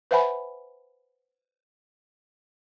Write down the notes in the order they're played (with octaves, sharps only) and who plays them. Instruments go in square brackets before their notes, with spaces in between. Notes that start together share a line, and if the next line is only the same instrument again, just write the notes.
[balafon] B4 C5 E5 F#5 G#5 B5